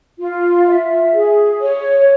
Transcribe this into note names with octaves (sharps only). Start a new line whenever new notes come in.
F4
E5
G#4
C#5